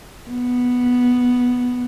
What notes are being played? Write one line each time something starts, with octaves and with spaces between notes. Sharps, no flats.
B3